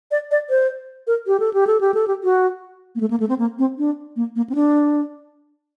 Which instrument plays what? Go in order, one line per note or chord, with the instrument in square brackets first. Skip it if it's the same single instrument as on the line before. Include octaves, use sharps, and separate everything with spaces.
[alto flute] D5
D5
C5
A#4
G4
A4
G4
A4
G4
A4
G4
F#4
A#3
A3
A#3
A3
C4
A#3
C4
D4
A#3
A#3
C4
D4